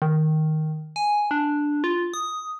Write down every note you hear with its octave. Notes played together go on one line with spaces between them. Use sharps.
D#3
G#5
D4
F4
D#6